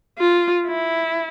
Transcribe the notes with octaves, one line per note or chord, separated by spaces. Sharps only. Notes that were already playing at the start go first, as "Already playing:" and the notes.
F4
E4